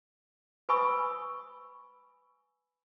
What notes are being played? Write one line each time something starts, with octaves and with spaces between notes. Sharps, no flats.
B4 G#5 B5 C#6 D#6 E6